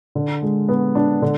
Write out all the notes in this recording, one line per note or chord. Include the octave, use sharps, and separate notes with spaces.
D3
G#3
B3
D4
D3